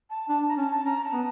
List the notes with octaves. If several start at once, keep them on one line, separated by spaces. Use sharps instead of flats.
A5
D4 A5
A#5
C#4 A5
A5
C#4 A#5
A5
B3